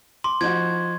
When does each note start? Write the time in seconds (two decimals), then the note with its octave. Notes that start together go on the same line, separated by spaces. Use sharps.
0.24 C6 D6
0.41 F3 D#4 F#4 G#6